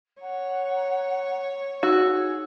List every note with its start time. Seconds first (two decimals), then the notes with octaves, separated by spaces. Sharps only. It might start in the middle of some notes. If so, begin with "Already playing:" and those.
0.21 C#5 F#5 A#5
1.83 D#4 F#4 G#4 E6